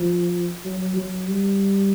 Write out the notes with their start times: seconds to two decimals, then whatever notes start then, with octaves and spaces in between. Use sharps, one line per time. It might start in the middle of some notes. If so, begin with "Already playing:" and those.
Already playing: F3
0.65 F#3
0.96 F#3
1.27 G3